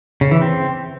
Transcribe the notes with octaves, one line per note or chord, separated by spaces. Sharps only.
C#3
E3
C4